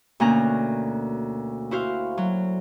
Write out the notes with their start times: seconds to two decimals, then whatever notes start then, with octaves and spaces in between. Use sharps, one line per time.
0.20 D2 B2 A#3 C#4 A#5 F#6
1.71 E4 F#4 C5 F5
2.18 F#3